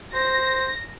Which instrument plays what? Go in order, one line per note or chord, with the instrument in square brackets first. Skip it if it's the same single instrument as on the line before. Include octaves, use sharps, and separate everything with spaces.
[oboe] C5 [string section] A#6